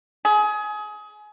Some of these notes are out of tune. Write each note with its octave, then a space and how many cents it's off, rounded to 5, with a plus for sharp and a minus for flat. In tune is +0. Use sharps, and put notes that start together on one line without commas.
G#4 +25